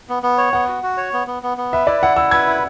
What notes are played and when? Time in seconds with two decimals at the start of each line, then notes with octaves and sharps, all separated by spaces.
0.09 B3
0.23 B3
0.38 C#5
0.53 B3 F#5
0.68 F#4
0.83 F#4
0.97 C#5
1.13 B3
1.27 B3
1.43 B3
1.57 B3
1.73 B4 E5
1.87 E4 D5
2.02 E4 F#5
2.16 E4 E6
2.31 B4 G#6
2.47 E4